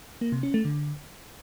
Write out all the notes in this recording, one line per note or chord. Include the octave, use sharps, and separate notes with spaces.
A#3
C3
C#4
A3
D3